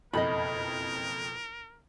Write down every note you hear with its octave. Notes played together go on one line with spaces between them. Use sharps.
F#1 F2 B2 A4 A#4 D#5 B5